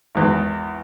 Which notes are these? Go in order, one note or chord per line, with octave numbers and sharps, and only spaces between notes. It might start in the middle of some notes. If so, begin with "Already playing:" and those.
G#1 E2